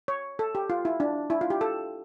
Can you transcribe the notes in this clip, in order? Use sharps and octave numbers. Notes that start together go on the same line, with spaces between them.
C#5
A4
G4
F4
E4
D4
E4
F4
G4
A4